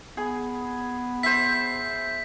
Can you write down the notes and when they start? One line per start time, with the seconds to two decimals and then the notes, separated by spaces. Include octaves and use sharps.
0.17 B3 G#4
1.23 C5 E5 B6